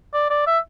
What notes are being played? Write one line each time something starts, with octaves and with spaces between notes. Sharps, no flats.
D5
D5
E5